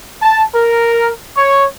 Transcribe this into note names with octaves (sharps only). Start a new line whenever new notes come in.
A5
A#4
C#5